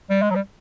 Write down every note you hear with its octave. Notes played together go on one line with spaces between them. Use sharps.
G3
G#3
F#3
G3